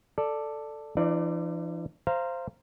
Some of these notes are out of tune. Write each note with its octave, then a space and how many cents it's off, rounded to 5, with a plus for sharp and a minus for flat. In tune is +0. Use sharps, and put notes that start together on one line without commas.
A4 +5 D5 +5
E3 +40 D#4 -45 D5 +0
C5 +0 F5 -20 A#5 +0